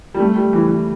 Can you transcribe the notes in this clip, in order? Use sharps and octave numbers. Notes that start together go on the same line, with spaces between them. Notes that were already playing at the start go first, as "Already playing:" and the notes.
G3
A3
G3
E3
E3